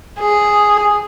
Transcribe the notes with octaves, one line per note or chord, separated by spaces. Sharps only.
G#4